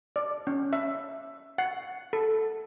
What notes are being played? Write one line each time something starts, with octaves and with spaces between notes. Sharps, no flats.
D5
C#4
E5
F#5
A4